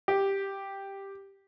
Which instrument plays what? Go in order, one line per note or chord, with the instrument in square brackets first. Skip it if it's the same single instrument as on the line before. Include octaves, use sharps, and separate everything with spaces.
[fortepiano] G4